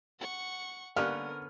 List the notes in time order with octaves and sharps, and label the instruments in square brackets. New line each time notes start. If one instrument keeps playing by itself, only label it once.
[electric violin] F#5 C#6
[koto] D3 B3 C#4 [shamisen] G3 A#3 [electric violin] A#4 [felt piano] F6